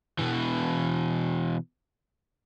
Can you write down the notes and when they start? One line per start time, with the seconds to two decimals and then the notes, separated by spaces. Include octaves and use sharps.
0.19 B2 E3